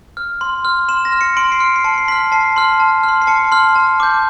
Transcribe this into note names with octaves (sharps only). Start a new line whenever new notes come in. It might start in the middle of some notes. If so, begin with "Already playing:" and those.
F6
C6
F6
C6 E7
A#6
F6
C#7
C6 D7
C7
F6 C#7
C7
A5 C#7
C7
C6 F6 B6
A5 C7
C6 F6
A5
F6
C6
C7
A5 C#7
C6 F6
A5
D6 G6